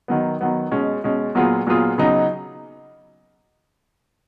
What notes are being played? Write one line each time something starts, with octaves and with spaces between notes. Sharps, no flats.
D#3 F#3 B3
D#3 F#3 B3
B2 G#3 C#4
B2 G#3 C#4
A#2 F#3 B3 F4 G#4
A#2 F#3 B3 F4 G#4
C#3 F#3 B3 D#4